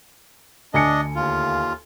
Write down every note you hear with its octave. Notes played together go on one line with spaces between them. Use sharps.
D2 D4 D#5 G#5 C#7
D#2 F4